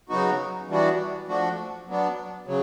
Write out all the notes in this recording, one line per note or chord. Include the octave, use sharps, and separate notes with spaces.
C#3 F#3 B3 D#4 F#4
E3 G3 B3 D4 F#4
F3 A3 D4 F#4
F#3 B3 D4
C#3 F#3